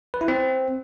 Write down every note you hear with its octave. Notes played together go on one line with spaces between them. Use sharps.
B4
E4
C4